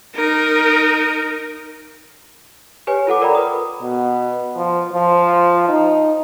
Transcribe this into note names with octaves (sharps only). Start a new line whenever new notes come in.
D#4 A#4
G4 B4 C#5 G#5
F4 A4 F#5 D6
A#4 D5 G5 A#5 B5
B4 D#6
B2
F3
F3
D#4